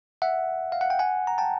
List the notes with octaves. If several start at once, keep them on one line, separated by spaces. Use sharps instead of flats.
E5 F#5
F5
F#5
G5
F#5 G#5
A#5
G5 A5